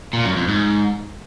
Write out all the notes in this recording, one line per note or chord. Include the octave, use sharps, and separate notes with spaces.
A#2
F#2
F2
G#2